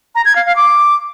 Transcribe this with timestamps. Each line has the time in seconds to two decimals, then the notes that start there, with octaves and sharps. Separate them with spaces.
0.15 A#5
0.25 G#6
0.36 F5
0.46 F5
0.56 D6